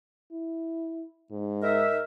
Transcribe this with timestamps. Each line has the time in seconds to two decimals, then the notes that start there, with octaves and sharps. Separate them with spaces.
0.32 E4
1.31 G#2
1.63 D#4 A#4 E5